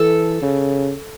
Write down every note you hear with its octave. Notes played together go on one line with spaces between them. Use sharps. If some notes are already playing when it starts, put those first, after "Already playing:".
Already playing: E3 A4
C#3